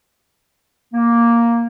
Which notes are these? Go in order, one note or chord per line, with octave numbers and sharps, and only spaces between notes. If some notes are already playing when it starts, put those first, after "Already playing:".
A#3